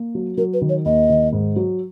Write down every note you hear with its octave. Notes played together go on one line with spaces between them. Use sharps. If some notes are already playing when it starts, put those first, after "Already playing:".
Already playing: A#3
F#3
F#3 A#4
B4
D#3
C#5
D#2 D#5
D#3
G#2
F#3